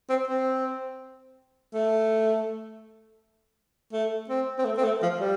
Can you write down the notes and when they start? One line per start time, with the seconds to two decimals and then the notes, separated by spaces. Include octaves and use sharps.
0.10 C4
0.28 C4
1.74 A3
3.93 A3
4.30 C4
4.59 C4
4.65 A3
4.78 C4
4.84 A3
5.02 F3
5.20 G3